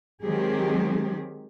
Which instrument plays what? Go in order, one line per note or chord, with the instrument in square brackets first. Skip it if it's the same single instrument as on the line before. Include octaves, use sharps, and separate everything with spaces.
[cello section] D#3 F#3 G#3 C4 G4 G#4